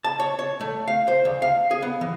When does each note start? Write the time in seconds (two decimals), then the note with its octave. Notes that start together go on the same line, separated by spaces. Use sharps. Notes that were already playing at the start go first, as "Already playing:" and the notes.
0.04 A5
0.20 C#5
0.39 C#5
0.61 A3
0.88 F5
1.08 C5
1.25 D2
1.42 F5
1.71 G#4
1.82 B3
2.01 E3